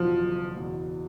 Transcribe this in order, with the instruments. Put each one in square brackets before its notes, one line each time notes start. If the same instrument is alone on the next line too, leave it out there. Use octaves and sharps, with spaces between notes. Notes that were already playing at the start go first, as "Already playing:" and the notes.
Already playing: [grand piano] F#1 E2 B2 F#3 [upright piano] F3
[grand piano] F#1
E2 B2 F#3